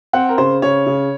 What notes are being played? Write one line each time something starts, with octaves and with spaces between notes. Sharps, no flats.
C4 F#5
A#4
C#3 C5
C#3 C#5
C#3